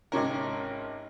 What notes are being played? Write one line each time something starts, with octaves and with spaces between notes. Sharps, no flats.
G#1 C3 C#4 A#4